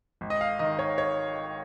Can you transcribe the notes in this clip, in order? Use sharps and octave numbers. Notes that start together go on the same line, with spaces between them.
G#1
D#5
F5
D#3 D#5
C#5
C#5